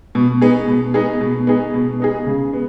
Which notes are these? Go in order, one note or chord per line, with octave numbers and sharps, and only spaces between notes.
B2
B3 D#4 G#4
B2
B3 D#4 G#4
B2
B3 D#4 G#4
B2
B3 D#4 G#4
C#3
B3